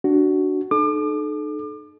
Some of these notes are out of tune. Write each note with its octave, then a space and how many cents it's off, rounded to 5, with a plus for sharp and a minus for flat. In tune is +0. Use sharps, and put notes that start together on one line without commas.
D4 +0 F#4 +10
D#4 -40 A4 -35 D6 +35